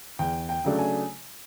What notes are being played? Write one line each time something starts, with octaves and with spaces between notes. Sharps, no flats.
E2 G5
G5
C#3 F#3 A3 D4
G#5